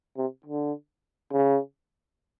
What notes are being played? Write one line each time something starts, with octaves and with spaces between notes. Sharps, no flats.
C3
D3
C#3